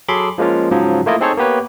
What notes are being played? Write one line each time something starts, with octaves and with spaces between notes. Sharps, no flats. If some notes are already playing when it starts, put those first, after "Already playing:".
F#3 G#4 A4 B5 C6 D6
F3 G#3 A#3 C#4 F4
G#2 C#3 F3 F#3
A3 A#3 E4 F4 D#5
C4 D#4 G#4 A4 C5 C#5
A#3 B3 G4 B4 C#5